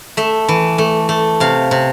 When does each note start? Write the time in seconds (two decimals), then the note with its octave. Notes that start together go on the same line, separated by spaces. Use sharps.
0.17 A3 E5
0.49 E3
0.78 A3
1.09 A3
1.40 C3 F5
1.71 C3